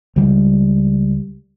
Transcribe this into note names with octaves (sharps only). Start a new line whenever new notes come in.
C#2 G3